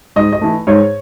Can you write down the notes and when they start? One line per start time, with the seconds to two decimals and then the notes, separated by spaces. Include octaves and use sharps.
0.16 G#2 D#5
0.33 D#5
0.41 E3 A3
0.67 G#2 C#5